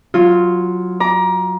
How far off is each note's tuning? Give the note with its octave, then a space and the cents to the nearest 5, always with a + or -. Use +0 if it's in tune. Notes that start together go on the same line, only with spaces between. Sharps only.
F#3 -10 F4 +0
A#5 +25 D6 +0